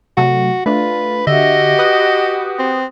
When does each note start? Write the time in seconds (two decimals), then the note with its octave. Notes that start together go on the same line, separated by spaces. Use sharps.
0.17 C3 F#3 A3 F#4
0.66 A3 D4 F4 B4
1.27 D3 F#4 G4 D#5 E5
1.79 B4 D#6 F#6
2.59 C4